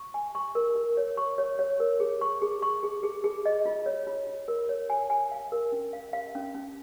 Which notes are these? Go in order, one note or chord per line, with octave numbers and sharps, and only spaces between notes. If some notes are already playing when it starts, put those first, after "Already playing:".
Already playing: C#6
G#5
C#6
A#4
A#4
C#5
C#6
C#5
C#5
A#4
G#4
C#6
G#4
C#6
G#4
G#4
G#4
D#5
F4
C#5
F4
F4
A#4
C#5
G#5
G#5
F5
A#4
C#4
F5
F5
C#4
C#4